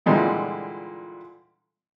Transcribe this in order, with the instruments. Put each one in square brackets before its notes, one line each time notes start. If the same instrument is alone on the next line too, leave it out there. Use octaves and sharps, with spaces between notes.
[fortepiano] A#2 D3 E3 G3 G#3 E4